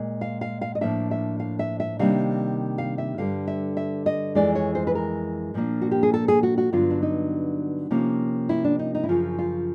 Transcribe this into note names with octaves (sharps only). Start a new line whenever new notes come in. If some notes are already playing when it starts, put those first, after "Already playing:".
Already playing: A#2 G#3
F5
F5
F5
D#5
A2 F3 A#3 D4 E5
E5
F5
E5
E5
C3 D#3 G3 A#3 D4 F5
F5
E5
G2 D3 G3 F5
E5
E5
D#5
F2 C3 E3 G#3 D5
C#5
C5
B4
A#4
A#2 F3 A#3 D4
F#4
G4
G#4
A4
G#4
F#4
F#4
G2 D3 F#3 B3 F4
D4
D#4
C3 F3 A#3 C#4
E4
D4
D#4
D#4
E4
F#2 C#3 F3 F4
F4